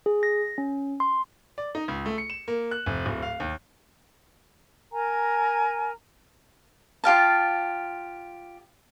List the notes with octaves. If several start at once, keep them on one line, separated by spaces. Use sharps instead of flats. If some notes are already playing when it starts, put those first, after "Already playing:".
G#4
A#6
C#4
C6
D5
D#4
C#2
A3
C#7
E7
A#3
F#6
F1
D1
F5
D#2
A#4 G#5 A#5
F4 G4 F5 A5